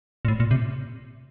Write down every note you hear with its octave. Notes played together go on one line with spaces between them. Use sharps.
A#2
A2
A#2
C3